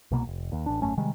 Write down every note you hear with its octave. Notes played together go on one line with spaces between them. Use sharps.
C2 B2 A#3
F1
D#2
A1 D4
G#1 F#2 A3 C#4
C3 D#3 G3 G#3